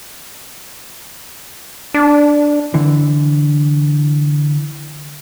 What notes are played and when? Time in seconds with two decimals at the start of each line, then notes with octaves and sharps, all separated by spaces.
1.94 D4
2.74 D3 E3